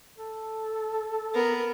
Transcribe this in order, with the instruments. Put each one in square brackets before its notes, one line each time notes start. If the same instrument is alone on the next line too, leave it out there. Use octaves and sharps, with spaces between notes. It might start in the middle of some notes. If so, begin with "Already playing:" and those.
[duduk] A4
[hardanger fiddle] B3 A#4